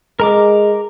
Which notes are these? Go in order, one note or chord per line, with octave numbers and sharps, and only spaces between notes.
G#3 A#4 A#5 D6